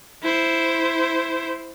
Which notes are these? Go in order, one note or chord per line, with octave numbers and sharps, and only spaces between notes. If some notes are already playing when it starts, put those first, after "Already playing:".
E4 C5